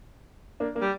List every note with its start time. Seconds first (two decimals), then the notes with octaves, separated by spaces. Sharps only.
0.60 A#3 D4
0.75 A#3 D4
0.82 G3